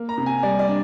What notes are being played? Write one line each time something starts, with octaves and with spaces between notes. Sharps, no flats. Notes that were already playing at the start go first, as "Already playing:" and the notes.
Already playing: A#3
A#5
C3
G#5
G3 D5
D5
D4